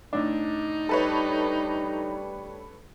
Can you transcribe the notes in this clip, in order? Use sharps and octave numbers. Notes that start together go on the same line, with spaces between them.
A2 D4 D#4
G3 A4 B4 C#5